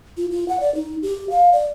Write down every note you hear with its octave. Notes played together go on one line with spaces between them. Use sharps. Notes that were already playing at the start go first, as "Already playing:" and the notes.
F4
F4
F#5
D5
D#4
G4
F5
D5